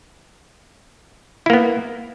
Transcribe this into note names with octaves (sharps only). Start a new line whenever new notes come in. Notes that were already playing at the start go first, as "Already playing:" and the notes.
A#3 B3 E4